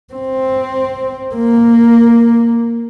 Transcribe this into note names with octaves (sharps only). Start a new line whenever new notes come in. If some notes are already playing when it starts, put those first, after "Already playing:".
C4
A#3